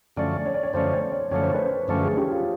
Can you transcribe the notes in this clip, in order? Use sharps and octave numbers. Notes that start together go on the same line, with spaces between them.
F#2 D3 F3 A3 C#4 D5
C#5
D5
C#5
F#2 D3 F3 A3 C#4 C5
C#5
D5
F#2 D3 F3 A3 C#4 C#5
C5
B4
C5
F#2 D3 F3 A3 C#4 B4
G#4
G4
F4